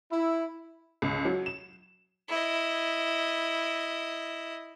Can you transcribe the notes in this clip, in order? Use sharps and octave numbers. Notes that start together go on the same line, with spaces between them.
E4
C#2
F#3
E7
E4 D#5